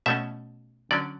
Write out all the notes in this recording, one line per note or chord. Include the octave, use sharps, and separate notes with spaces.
B2 A3 C#4 E5
D3 F#3 C#4 D5